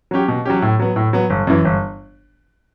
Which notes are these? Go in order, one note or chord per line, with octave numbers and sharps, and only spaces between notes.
F#3 C#4 G4
B2
F#3 C#4 G4
A2
F#3 B3
A2
F#3 B3
G1
F#2 E3
G1